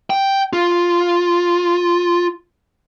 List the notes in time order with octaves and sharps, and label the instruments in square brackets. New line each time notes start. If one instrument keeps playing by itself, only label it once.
[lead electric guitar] G5
F4